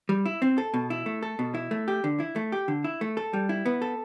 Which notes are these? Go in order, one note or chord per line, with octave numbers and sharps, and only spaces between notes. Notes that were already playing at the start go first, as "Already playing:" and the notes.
G3
E4
C4
A4
B2
E4
A3
A4
B2
E4
A3
G4
D3
E4
A3
G4
D3
E4
A3
A4
G3
E4
B3
A4